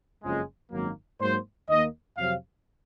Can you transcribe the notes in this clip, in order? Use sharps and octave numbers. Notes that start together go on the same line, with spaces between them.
F#1 F2 C#3 F3 G#3
G#1 F#2 D#3 F#3 A#3
G#2 F#3 A#3 C5
D#2 D#3 A#3 D#5
F2 C3 F#3 C4 F5